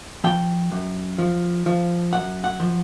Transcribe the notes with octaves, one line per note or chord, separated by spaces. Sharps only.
F3 G5
F#2
F3
F3
F#2 F#5
F#5
F3